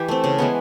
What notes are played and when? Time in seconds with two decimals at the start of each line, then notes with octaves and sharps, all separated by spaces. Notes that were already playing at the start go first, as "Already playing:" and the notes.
Already playing: E3 G4
0.08 A3 C4
0.24 C#3
0.39 E3 G#3 B3